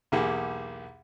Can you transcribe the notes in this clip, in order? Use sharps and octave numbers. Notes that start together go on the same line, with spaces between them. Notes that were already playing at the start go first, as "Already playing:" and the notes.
B1 E2 A#3 G4 G#4 F#5